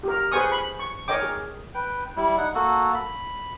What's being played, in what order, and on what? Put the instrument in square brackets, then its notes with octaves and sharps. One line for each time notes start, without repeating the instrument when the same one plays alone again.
[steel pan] G4 A#4
G#4 B4 C5 G#5 C#6 D#6
B5
C#6
A#4 C#5 D#5 G5 D6
G#4
[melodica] B4 G5
G3 E4
D#4 F#5
A#3 F#4 A4
B5